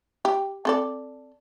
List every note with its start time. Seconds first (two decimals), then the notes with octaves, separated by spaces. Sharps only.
0.25 G4
0.65 C4 A4 D5